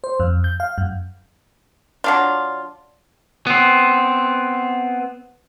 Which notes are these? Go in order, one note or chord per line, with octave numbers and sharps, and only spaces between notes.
C5
F2
G6
F5
F#2
F#3 D4 F4
B3 C4